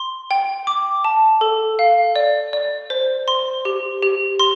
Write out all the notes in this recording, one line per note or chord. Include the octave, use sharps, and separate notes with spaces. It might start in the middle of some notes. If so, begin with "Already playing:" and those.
Already playing: C6
G5
D6
A5
A4
F5
D5
D5
C5
C6
G4
G4
C6